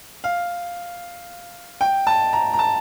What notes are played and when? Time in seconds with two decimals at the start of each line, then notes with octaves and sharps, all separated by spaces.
0.24 F5
1.81 G5
2.07 A5
2.33 A#5
2.53 A#5
2.59 A5